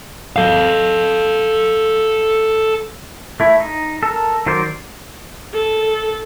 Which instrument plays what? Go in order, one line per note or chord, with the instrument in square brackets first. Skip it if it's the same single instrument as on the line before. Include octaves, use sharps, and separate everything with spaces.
[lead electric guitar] A4 F5
[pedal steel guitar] A3 E4
D#4
A4 A#4
D#3 F#3 A#4 C5 D5
[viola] A4